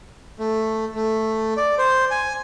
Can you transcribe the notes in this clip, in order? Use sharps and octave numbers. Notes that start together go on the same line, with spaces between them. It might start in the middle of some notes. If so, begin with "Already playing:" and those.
A3
A3
D5
C5
G#5